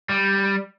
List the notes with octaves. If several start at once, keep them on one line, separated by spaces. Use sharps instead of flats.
G3